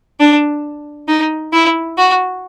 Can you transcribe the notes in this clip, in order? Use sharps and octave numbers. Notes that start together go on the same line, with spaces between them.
D4
D#4
E4
F#4